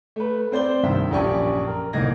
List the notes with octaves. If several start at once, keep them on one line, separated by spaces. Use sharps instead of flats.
A3 B4
C4 C5 D5 G7
C2 G2 D#3 E5
A#1 F#2 G4 D5 G#5 C#6
A#4
D1 C2 A#3 D#4 G#6 A#6